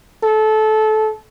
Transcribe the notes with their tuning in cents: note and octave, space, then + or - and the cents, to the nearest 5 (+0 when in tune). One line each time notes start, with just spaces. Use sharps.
A4 -20